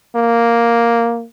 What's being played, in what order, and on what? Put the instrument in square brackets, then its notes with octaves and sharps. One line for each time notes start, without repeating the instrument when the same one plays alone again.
[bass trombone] A#3